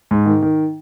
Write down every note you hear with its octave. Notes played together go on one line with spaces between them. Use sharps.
G#2
D#3
D#3